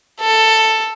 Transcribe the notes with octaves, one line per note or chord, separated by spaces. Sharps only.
A4